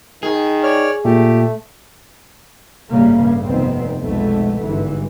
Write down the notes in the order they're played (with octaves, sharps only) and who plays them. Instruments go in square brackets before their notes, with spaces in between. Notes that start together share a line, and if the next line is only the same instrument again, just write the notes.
[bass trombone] D#3 [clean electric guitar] G#4
[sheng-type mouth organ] C#5 D5 F6
[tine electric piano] A#2 [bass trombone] A3 [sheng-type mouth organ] G4
[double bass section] A1 G2 C#3 G3 A3 A#3
F1 D#3 B3 C4
B1 F2 D3 G#3 A3 B3
G#1 G2 D3 E3